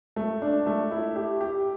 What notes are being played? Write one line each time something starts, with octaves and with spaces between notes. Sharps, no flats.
A3
D4
A3
E4
G4
G4